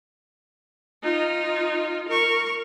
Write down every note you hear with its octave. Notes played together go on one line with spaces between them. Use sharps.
D#4 F4
A#4 C#6